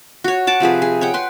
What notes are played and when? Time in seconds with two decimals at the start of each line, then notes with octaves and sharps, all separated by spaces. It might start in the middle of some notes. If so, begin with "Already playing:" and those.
0.24 F#4 C#5
0.47 F#5 A5 D6
0.60 C3 F3 G#4 B4
0.82 G#4
1.01 C#5 F#5 G5
1.14 B4 C6